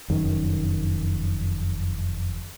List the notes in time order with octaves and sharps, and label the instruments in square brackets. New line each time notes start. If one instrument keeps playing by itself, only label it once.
[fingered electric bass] F1 F#2 D#3